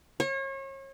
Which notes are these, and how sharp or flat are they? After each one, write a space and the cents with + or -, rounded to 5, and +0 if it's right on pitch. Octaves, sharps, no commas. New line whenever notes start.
C#5 -35